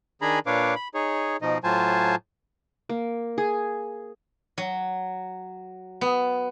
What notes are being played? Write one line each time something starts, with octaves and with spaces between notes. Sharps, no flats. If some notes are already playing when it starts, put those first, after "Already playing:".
D#3 D4 G#4 G#5 A#5 B5
A#2 D4 B4 C#5 F5 D6
B5
D#4 G#4 C#5
B2 F3 D#4 D#5
A2 F#3 F4 C5 G#5 A5
A#3
G#4
F#3
B3